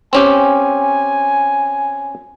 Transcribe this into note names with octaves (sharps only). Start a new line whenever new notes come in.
C4 C#4 G4 G#5